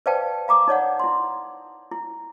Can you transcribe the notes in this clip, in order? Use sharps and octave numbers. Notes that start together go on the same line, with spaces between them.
B4 C5 D5 F5 G5 A5
F5 A#5 D6 D#6
D#4 C#5 D5 F#5
E4 C6
E4